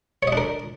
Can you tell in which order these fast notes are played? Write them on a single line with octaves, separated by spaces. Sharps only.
C#5 D#5 D4 A#4